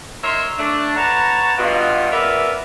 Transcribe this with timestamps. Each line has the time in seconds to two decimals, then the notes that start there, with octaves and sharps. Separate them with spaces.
0.23 D#4 A#4 C#5 E5 C6
0.57 A3 D4
0.95 B4 C#5 F#5 A5 A#5
1.58 G2 B2 F4
2.10 C#3 B3 F4 A#4 D5 E5